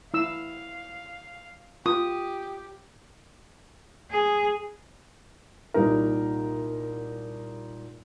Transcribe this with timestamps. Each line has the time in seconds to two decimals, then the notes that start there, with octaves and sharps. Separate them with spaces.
0.14 E4 F5 E6
1.86 F4 G4 D#6
4.10 G#4
5.74 C2 A#2 G3 D#4 A#4